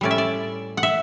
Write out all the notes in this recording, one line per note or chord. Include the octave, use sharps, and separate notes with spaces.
A2 G3 C#4 E4 D5
E5
D5
F#5
E5